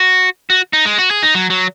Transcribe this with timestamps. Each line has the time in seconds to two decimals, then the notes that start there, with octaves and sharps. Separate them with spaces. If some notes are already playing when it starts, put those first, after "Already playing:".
Already playing: F#4
0.50 F#4
0.73 D#4
0.86 G#3
0.99 F#4
1.11 G#4
1.23 D#4
1.35 F#3
1.50 F#3